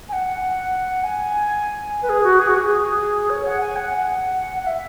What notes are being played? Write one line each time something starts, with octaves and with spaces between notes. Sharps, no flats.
G#5
F#5
G#5
B4
G#4
F#4
G#4
F#4
G#4
C#5
F#5
G#5
F#5
F#5
E5